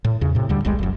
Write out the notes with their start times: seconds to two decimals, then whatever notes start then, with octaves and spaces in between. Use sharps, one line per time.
0.04 A2
0.21 E2 C#3
0.35 A2 C3
0.49 D2 D3 G3
0.65 D#1 B1 G3 G#3
0.79 F#1 F#2